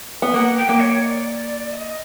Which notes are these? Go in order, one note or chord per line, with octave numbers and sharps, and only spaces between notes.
B3
A#3 F#5
G5
A#3
C#5
D#5
D5
E5
D#5